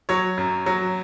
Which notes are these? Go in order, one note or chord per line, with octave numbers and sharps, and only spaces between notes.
F#3 C#5
F#2
F#3